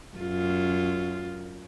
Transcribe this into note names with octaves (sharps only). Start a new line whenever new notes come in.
F#2 F4